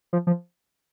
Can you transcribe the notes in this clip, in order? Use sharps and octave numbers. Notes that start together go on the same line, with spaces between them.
F3
F3